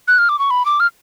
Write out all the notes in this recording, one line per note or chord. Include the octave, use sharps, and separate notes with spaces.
F#6
F6
D6
C#6
B5
D6
F6